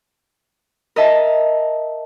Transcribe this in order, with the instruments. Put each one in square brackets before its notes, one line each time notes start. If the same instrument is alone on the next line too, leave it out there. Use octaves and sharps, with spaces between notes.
[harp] A#4 D#5 E5 A5